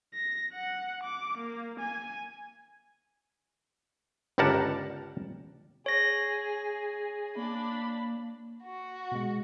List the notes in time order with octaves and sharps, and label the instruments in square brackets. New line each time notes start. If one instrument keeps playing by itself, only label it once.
[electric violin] A#6
F#5
D6
A#3
G#5
[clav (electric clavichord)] G1 C#2 G3 A#4 F#5 A5
[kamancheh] G#4 [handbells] C#5 A#6
[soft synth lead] A#3 [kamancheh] D4 B5
[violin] F#4
[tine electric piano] B2 G#3